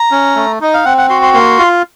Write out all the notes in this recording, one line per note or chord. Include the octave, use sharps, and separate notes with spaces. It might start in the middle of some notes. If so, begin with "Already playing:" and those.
Already playing: A#5
C#4
A3
D#4 D#5
F5
C4 F#5
F#5
F#4 C6
C6
A#3 C6
F4